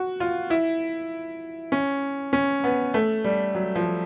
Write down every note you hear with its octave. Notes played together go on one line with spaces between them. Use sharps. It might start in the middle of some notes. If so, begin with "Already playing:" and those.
Already playing: F#4
F4
E4
C#4
C#4
B3
A3
G3
F#3
F3